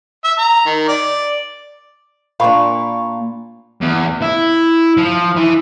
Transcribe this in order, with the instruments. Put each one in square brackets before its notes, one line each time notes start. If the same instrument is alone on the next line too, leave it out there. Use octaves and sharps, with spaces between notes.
[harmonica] E5
A#5
D#3
D5
[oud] A#2 D4 [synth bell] F5 B5 C#6
[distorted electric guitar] E2
E4
F3
E3